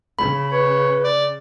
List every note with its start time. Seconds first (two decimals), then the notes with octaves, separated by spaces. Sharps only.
0.19 C#3 B5
0.52 B4 C#5
1.04 D5